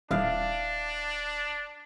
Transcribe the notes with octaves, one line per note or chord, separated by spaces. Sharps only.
D#1 D4 E4 D#5 F5